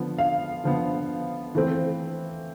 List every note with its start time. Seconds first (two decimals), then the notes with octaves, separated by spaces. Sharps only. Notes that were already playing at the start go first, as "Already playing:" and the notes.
Already playing: D3 F3 B3
0.18 F5
0.64 D3 F3 B3
1.55 E3 A3 C4